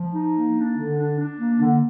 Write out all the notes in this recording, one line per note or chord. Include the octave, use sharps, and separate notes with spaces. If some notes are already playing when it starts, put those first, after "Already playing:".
Already playing: F3
D#4
A#3
D4
D3
D4
D4
A#3
D3